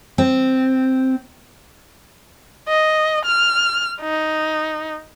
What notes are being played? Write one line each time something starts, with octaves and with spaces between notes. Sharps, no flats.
C4
D#5
F6
D#4